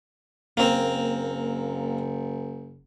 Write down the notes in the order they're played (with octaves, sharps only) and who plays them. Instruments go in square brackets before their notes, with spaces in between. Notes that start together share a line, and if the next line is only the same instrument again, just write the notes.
[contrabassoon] F#1 [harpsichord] A#3 C4